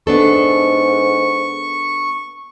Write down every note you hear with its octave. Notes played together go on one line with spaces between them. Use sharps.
G#2 B3 D4 A4 C#6